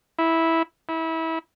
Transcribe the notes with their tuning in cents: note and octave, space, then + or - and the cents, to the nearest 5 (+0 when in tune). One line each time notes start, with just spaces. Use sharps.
E4 -10
E4 -25